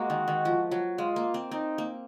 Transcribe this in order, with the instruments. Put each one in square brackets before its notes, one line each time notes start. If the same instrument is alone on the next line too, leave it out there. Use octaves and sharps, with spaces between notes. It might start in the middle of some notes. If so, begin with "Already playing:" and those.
Already playing: [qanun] G#3 A#3 [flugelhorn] F#4
[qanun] D#3
D#3
F3
F#3
[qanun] G#3 [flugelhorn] F4
[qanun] A#3
C4
[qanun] C4 [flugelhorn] D#4
[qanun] A#3